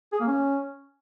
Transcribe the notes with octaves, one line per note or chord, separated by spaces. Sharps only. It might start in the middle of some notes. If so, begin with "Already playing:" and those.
G#4
A#3
C#4